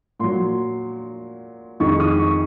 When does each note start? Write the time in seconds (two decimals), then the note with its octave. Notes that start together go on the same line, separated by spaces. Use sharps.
0.20 A#2 F#3 C6
1.80 F2 D#3 G#3 C#6
2.00 D#6
2.19 C#6